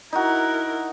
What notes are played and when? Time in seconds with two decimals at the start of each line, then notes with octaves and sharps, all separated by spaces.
0.13 D#4 E4 F#4 A#4